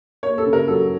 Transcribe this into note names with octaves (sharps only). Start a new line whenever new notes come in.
A#3 C#5
A4
C#3
A#4
F#3 A4